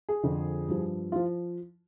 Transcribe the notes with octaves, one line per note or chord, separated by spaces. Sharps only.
G#4
F2 D3 F3
G2 F3
F3 F4